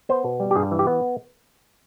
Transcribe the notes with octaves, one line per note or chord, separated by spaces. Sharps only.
B3 C5
B2
G3
G4
G2 G#4
E3
G4
B3